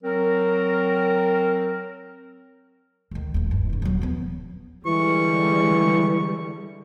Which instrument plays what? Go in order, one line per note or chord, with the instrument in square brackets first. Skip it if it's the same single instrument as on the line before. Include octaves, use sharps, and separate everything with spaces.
[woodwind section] F#3 C4 A#4
[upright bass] D2 D#3
D#1 A3
G2
C#3 D#4
D#1 F#3
F3 B3
[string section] D3 G3 G#3 [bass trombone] E3 [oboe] C#6